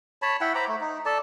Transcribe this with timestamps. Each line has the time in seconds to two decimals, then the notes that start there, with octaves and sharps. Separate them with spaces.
0.22 C#5 A5 B5
0.41 E4 F#5 G5 B5
0.55 C5 A#5 B5 D6
0.68 A3
0.81 D#4
1.06 A4 D5 A5